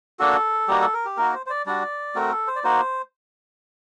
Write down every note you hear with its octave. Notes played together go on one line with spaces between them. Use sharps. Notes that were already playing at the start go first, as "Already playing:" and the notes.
A#3 D4 F#4 A4
G3 A#3 D#4 F#4 G4
A4
A#4
G4
A#3 D#4 F#4 A#4
C5
C5
D5
G3 D4 F#4 D5
A3 C4 F#4 A#4
A4
C5
D5
A#3 D#4 F#4 C5